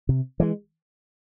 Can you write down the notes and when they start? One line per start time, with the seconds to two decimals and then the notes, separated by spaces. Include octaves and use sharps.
0.09 C3
0.40 E3 G#3